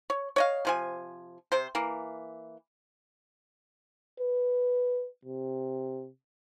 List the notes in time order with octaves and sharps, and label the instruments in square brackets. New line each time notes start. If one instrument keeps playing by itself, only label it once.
[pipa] C#5
C#5 D#5 F5
C3 F3 G#5
C3 C5
E3 A#3
[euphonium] B4
C3